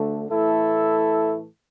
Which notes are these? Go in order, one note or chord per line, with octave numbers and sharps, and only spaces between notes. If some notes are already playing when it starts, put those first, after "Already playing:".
Already playing: D2 D3 A3
A2 E3 A3 E4 A4